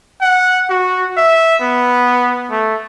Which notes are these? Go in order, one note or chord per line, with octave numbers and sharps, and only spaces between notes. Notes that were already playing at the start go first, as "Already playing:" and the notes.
F#5
F#4
E5
B3
A3